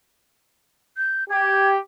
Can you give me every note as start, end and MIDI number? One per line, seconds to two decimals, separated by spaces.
0.97 1.24 91
1.30 1.78 67
1.30 1.68 92